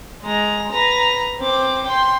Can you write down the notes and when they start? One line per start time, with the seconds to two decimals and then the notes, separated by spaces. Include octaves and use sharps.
0.23 G#3 A#5
0.71 B4 A#5
1.39 C4 D6
1.86 G5 C6